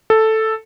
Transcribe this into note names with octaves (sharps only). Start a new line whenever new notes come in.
A4